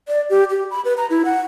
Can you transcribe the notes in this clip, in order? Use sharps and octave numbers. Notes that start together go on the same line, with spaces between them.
D5
G4
G4
B5
B4
A#5
E4
F#5